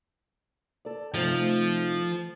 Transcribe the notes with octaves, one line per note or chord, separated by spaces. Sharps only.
A4 D5
C3 F3 A3 C4 D#4